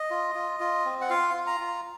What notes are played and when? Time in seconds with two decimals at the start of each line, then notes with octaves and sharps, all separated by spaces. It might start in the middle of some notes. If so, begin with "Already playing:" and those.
Already playing: D#5
0.11 F4
0.35 F4
0.60 F4
0.85 C4
1.01 F#5
1.10 F4 F5
1.34 F4
1.47 A#5
1.60 F4